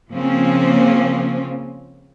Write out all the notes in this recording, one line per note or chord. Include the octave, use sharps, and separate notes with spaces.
C#3 F3 A#3 C4 C#4